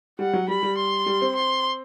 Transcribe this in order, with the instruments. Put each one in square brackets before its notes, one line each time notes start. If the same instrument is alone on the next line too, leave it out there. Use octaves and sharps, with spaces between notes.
[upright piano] G3 [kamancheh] F#5
[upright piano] F#3
[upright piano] G3 [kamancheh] B5
[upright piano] G3
[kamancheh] C6
[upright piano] G3
C4
[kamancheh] C6